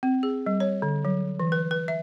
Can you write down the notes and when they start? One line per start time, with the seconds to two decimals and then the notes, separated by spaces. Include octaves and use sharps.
0.03 C4
0.23 G#4
0.46 G3
0.60 C#5
0.82 D3
1.05 F#3
1.40 E3
1.52 B4
1.71 B4
1.88 E5